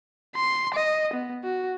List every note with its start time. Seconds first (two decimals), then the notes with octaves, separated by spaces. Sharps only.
0.36 C6
0.74 D#5
1.14 B3
1.44 F#4